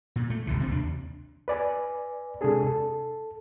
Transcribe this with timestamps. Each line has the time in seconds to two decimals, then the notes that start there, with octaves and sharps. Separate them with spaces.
0.16 A#2
0.30 A3
0.47 F#1 C#2 D3 E3
0.60 C3 A#3 C4
0.71 D#2 D4
1.48 B4 D5 G#5
2.41 C3 G#3 D4 G#4 A4
2.67 A4